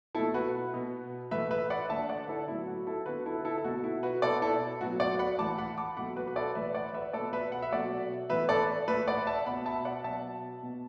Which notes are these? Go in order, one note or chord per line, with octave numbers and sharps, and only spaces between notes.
B2 A3 E4 A4
F#4 B4
B2 B3
A2 E3 A3 B4 E5
B4 E5
D5 F#5
D3 A3 E5 A5
D5 F#5
E4 A4
A2 F#3 B3 E4
F#4
E4 A4
D3 B3 F#4 B4
E4 A4
E4 A4
A4
B2 A3 F#4
E4
F#4 B4
B2 B3 A4 D5
E4 A4
A2 F#3 B3 F#4
D5 F#5
F#5 B5
A2 E3 A3 A5 D6
F#5 B5
A5 D6
B2 F#3 A3 F#5 B5
F#4 B4
B4
A4 D5
A2 E3 A3 B4 E5
D5 F#5
B4 E5
B2 A3 A4 D5
B4 E5
F#5
E5
B2 F#3 A3 D5 F#5
A2 E3 B3 B4 E5
A4 D5
A2 A3 B4 E5
D5 F#5
E5 A5
B2 B3 F#5 B5
E5 A5
D5 F#5
B2 F#3 B3 E5 A5
B2 B3